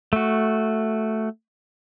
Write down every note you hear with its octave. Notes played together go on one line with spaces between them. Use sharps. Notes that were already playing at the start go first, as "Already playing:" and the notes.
A3 F#4